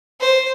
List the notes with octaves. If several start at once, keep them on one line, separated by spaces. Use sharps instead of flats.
C5